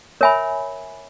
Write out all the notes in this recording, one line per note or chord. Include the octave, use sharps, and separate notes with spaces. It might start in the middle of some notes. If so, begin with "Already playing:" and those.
A#4 C#5 E5 G#5 B5